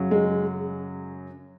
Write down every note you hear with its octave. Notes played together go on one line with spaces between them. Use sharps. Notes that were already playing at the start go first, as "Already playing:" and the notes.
Already playing: F#2 C#3 F#3
G#3